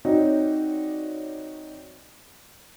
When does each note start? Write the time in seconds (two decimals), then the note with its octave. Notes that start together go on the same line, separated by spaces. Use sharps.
0.05 C4 D#4 F#4 C#5 D5